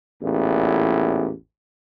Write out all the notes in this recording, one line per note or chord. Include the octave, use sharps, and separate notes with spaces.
A1 E2 A#2